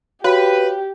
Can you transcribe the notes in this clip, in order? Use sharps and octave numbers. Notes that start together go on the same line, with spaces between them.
F#4 G4 B4 C#5 F5